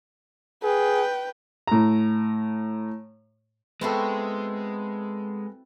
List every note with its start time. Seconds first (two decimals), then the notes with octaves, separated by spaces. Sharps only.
0.63 G#4 B4 G5
1.67 A2 A#5
3.81 G#3 B3 C4 E4 F#4 A4